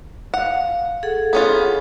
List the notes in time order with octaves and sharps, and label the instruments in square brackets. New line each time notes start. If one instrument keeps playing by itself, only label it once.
[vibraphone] F5 [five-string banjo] F#5
[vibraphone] G#4 A4 F#5
[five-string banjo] B3 C#4 F4